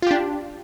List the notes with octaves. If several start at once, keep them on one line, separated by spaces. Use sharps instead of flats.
D4 F4 G4